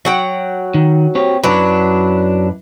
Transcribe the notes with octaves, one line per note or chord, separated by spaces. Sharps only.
F#3 F#5 G5
D#3
C4 G4 C#5
F#2 F#3 D4 E4 B4